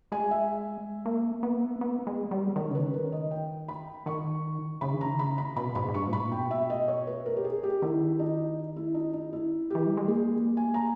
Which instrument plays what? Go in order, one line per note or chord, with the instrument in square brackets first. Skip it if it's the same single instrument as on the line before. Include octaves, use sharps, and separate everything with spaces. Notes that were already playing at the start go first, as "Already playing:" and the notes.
[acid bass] G#3 [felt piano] G#5
[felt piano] E5
[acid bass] A#3
B3
A#3
B3
B3
G#3
G3
[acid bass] D#3 [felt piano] C#5
[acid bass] C#3 [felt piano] B4
[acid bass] D#3
[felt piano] A#4
D#5
G5
B5
[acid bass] D#3 [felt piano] C#6
[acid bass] C#3 [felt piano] B5
[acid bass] D#3
[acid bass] C#3 [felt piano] A#5
[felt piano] B5
B5
[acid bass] B2 [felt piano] B5
[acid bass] G#2 [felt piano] B5
[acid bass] G#2
[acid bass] G2 [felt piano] C#6
[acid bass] A#2
[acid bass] G#2 [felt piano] B5
[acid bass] A#2
[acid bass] B2 [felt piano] G5
[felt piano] E5
D#5
C#5
B4
A#4
G4
G#4
G4
[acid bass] D#3 [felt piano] E4
[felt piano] D#4
E4
D#4
D#4
E4
[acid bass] E3 [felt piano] G4
[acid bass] G3
G#3
[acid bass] A#3 [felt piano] G#4
[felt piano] G#5
A#5